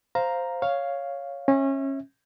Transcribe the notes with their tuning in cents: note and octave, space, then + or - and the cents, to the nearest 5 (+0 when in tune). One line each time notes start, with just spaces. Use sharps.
C5 +0 F5 +0 A#5 +0
C#5 +0 F5 +0
C#4 -25 E5 -15